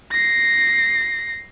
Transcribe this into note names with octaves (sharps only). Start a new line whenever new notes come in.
A#6 C7